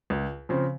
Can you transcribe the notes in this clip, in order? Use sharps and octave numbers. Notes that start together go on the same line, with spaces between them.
C#2
C#3 F3 C4